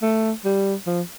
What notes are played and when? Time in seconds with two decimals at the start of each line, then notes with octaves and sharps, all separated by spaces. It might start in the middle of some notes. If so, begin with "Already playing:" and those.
0.02 A3
0.45 G3
0.87 F3